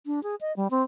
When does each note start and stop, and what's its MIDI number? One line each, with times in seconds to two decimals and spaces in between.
0.06 0.23 62
0.23 0.35 68
0.41 0.55 75
0.56 0.68 55
0.71 0.83 60